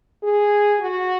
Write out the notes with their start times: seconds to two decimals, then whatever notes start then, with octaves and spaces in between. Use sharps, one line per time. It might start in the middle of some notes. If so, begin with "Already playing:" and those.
0.23 G#4
0.80 F#4